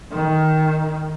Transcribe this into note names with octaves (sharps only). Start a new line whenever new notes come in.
D#3